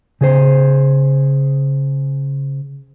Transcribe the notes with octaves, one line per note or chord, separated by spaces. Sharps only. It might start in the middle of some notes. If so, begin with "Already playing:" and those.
C#3 G#4 C5